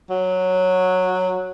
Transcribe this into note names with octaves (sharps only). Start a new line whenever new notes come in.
F#3